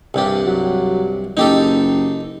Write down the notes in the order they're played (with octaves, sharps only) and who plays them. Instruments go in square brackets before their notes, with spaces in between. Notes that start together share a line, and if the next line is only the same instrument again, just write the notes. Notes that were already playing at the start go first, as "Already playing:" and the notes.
[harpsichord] C2 G2 G4
[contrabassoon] F#3
[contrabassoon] F#1 [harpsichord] D#4 G4 A4